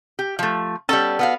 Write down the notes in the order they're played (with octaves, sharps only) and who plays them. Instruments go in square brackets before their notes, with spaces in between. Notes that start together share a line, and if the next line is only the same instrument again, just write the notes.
[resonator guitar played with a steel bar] G4
F3 A3
[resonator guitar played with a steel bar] G3 B3 C#4 [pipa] A4
[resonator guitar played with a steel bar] B3 F#4 F5